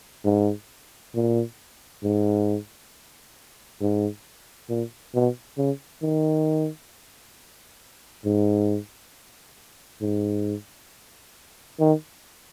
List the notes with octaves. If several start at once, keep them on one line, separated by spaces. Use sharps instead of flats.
G#2
A#2
G#2
G#2
A#2
B2
C#3
D#3
G#2
G#2
D#3